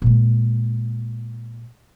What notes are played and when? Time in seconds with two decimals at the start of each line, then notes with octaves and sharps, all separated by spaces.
0.02 A#2 G#3